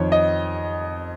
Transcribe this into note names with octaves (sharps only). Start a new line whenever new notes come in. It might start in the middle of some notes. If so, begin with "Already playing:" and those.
Already playing: F2 D#3 C#5
D#5